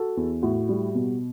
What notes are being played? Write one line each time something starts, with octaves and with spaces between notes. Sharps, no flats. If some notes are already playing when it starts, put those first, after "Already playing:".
Already playing: F#4 A4
E2
A2 F#4
G3
B2